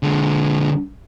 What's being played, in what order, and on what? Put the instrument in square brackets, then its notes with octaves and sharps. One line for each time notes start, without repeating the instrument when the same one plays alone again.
[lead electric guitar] D3 G#3